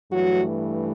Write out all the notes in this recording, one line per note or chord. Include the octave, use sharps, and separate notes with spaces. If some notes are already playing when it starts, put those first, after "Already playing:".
G2 E3 F#3 A3 F#4